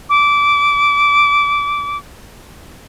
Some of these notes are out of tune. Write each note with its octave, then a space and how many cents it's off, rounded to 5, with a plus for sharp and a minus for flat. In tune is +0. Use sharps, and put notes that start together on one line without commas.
D6 -15